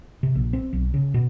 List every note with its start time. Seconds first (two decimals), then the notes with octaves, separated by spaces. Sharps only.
0.23 C3
0.35 A#1
0.53 C4
0.73 B1
0.94 C#3
1.14 B2